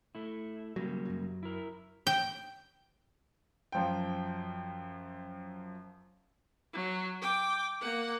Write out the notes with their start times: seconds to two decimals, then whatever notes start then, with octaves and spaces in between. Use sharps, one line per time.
0.15 A3 E4
0.76 C#3 F#3 G3 A#3
1.05 F#2 F#3
1.43 E4 A#4
2.07 G5
3.72 F#2 F3 G5
6.73 F#3
7.21 G5 D6
7.81 A#3 F#5